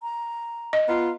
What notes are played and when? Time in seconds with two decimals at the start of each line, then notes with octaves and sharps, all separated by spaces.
0.02 A#5
0.73 D#5
0.88 B3 F4 A#5